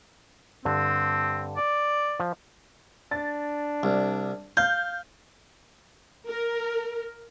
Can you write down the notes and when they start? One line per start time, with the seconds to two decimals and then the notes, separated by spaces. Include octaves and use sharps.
0.65 G2 D3 C4
1.57 D5
2.20 F3
3.11 D4 A6
3.83 C2
4.57 F5 G6
6.28 A#4